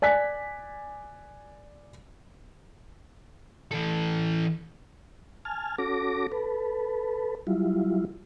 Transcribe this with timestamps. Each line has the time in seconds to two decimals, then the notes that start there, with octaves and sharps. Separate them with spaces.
0.02 D5 G#5 F#6 B6
3.71 E3 A4
5.45 G#5 A5 F6
5.78 C#4 F#4 A4 D6 A#6
6.32 A4 B4
7.47 F#3 G3 E4 F4